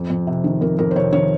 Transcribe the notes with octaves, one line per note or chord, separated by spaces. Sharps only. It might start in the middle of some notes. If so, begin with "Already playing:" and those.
Already playing: F2
F2
C3
D#3
F2 A#4
F2 A#4
C5
C3 C#5
D#3 C#5